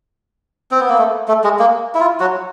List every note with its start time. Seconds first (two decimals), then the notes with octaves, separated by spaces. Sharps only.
0.71 C4
0.80 B3
0.89 A#3
0.98 A3
1.28 A3
1.44 G#3
1.59 A#3
1.95 E4
2.00 F4
2.20 F#3 F#4